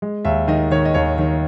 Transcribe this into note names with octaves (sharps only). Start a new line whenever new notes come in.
G#3
D#2 E5
D#3 D#5
D#3 C#5
D#5
D#2 C#5
D#3